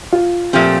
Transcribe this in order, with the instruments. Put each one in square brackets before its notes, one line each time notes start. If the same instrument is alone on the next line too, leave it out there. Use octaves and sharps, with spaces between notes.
[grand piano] F4
[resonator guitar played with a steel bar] A#2 F3 A3 C4 G4